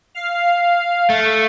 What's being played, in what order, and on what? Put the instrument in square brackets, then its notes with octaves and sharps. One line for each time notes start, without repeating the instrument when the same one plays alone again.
[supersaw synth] F5
[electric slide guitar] A3